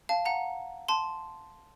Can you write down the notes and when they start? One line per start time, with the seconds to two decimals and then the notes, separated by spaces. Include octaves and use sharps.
0.09 F5 A5
0.25 F#5 A#5
0.88 A5 C6